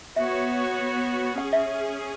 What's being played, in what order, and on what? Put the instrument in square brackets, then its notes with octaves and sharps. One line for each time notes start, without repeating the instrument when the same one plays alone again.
[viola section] B3 F#4 C#5 [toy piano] E5
[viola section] C#4 G#4 [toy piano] F#5
[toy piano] E5